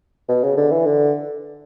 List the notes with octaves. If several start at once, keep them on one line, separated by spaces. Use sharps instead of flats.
B2
C#3
D3
E3
D3